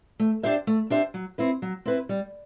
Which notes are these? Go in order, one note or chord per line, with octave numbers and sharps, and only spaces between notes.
A3
D4 G4 C5 E5
A3
D4 G4 C5 E5
F#3
C4 E4 B4
F#3
C4 E4 B4
G3